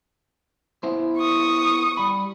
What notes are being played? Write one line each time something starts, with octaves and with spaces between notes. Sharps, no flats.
B3 E4 C5
C#6 D#6
G3 B5